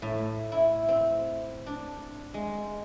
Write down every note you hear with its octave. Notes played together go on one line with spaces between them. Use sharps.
A2
E4
C4
D4
G#3